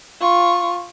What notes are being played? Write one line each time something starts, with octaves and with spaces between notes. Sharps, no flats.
F4 C#6